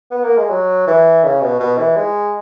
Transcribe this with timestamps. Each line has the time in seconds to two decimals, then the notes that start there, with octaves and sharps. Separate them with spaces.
0.11 B3
0.24 A#3
0.37 G#3
0.50 F#3
0.87 E3
1.24 C#3
1.42 B2
1.60 B2
1.78 E3
1.96 G#3